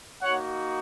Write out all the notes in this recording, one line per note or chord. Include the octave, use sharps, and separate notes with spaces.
A#3 D#4 F#4 C#5 F#5